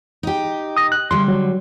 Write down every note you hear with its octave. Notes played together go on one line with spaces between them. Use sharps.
D#4 G4
D#6 A#6
F#6
D3 G3 C6
F#3